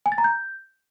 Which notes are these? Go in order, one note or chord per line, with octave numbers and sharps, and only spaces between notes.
G#5
A6
A#5
G6